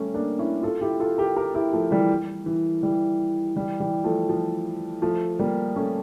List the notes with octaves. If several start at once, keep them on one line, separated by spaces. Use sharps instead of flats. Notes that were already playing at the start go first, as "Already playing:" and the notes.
Already playing: G3 A3 C#4
A#3 D4
C#4 E4
F4 A4
E4 G4
F4 A4
G4 A#4
G4 A#4
E4 G4
F3 A3
E3 G3
E3
E3 G3
E3 G3
E3 G3
F3 A3
F3
F3 A3
G3 A#3
A3 C#4